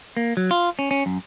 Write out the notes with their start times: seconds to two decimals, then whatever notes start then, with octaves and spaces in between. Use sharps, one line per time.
0.17 A#3
0.37 F#3
0.51 F4
0.79 C#4
0.91 C#4
1.06 F#2